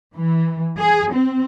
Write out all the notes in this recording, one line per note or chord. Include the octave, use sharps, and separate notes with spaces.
E3
G#4
C4